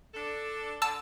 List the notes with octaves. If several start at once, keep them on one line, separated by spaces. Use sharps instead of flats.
D4 A4
D3 A5 E6